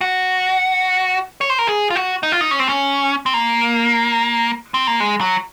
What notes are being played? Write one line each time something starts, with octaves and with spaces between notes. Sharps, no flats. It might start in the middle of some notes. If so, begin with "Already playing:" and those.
F#4
C#5
C5
A#4
G#4
F4
F#4
D#4
F4
D#4
C#4
C4
C#4
C4
A#3
C4
A#3
G#3
F#3